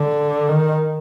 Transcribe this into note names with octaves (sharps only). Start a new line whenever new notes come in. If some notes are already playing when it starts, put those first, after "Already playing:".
Already playing: D3
D#3